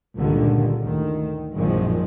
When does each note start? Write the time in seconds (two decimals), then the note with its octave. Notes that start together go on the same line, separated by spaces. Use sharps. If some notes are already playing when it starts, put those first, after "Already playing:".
0.17 C#2 G2 A#2 D3 D#3
0.82 D2 D#3
1.54 A#1 F#2 A#2 D#3 F3 G#3